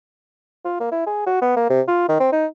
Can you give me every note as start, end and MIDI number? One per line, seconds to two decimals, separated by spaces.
0.65 0.79 65
0.80 0.88 58
0.92 1.05 64
1.06 1.25 68
1.26 1.41 66
1.41 1.55 59
1.56 1.67 58
1.70 1.81 48
1.88 2.04 65
2.09 2.17 51
2.20 2.27 60
2.32 2.46 63